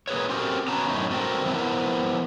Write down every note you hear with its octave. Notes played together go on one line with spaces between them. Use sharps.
A#3 G#4 B4 C#5
C4 C#4 F#4 G4 A4 A#4
B3 C#4 F#4 A5 A#5
F#2 A2 C#4 D#4
G2 C4 F#4 A4 A#4 G5
F3 B3 E4 G#4 A#4 B4